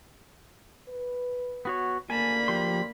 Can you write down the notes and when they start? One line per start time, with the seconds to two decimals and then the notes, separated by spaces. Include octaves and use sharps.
0.89 B4
1.65 B3 F#4 C#5
2.10 F#1 D2 A#3 D5 G#5 A5 B5
2.48 F3 G4 C6